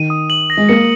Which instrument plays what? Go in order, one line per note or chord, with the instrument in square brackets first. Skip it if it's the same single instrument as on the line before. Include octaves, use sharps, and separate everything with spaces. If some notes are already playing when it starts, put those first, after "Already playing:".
Already playing: [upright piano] D#3 [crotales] D#7
[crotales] D#6
F#7
A#6
[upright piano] G#3
[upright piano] A#3 [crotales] C#7